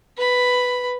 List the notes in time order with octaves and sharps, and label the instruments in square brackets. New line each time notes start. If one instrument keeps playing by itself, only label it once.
[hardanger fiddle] B4 B5